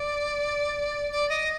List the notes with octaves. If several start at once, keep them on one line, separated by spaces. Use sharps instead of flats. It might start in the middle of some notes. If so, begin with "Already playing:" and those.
Already playing: D5
D5
D#5